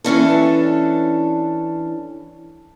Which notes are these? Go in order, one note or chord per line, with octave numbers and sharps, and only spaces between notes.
E3 C#4 D4 A4